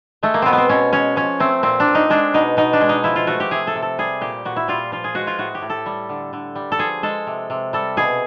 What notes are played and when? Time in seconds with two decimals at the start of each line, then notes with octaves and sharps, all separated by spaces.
0.23 G#3 A3
0.34 A#3
0.42 B2 B3 C4
0.53 B3 C4
0.69 B2 C#4
0.93 G#3 C#4
1.16 F3 C#4
1.40 A3 C4
1.63 A#2 C4
1.80 D4
1.87 A#2
1.95 D#4
2.10 G#3 D4
2.34 B2 D#4
2.57 B2 D#4
2.73 D4
2.81 G#3
2.89 D#4
3.04 F3 E4
3.16 F4
3.27 A3 F#4
3.40 G4
3.51 C3 G#4
3.67 A4
3.75 C3
3.82 A4
3.99 G3 G#4
4.21 A#2 G4
4.45 A#2 F#4
4.56 E4
4.68 G3 F4
4.92 F3 F4
5.04 G#4
5.15 G#3 F#4
5.27 F4
5.39 A2 F#4
5.55 G4
5.62 A2
5.70 A4
5.86 G3
6.09 D3
6.33 D3
6.56 G3
6.72 A4
6.79 F3 G#4
7.03 G#3 A4
7.27 C3
7.50 C3
7.73 G3 A4
7.97 B2 G#4